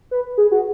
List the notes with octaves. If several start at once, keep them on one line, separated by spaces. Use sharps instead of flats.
B4
G#4
F#4